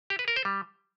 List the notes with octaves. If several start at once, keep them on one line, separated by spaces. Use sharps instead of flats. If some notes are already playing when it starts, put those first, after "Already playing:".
G4
B4
A#4
C5
G3